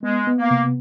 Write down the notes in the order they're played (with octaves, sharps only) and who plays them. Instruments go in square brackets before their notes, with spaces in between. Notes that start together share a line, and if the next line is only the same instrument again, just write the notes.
[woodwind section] G#3 [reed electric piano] B3
[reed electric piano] B3
[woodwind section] A#3
[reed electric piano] C3